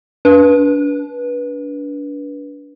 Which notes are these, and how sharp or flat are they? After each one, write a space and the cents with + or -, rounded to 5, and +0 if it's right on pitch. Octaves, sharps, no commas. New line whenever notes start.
D4 -30 B4 -20